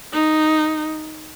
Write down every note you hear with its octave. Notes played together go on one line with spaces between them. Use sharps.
D#4